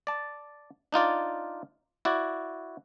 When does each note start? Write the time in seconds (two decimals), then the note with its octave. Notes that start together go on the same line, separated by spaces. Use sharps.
0.07 D5 A5
0.92 D4 D#4 F4 D5
2.05 E4 F#4 D5